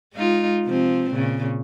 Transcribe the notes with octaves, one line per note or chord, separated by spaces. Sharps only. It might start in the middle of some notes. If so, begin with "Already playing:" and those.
G#3 D#4 F4
C3 F3 C4
A#2 C#3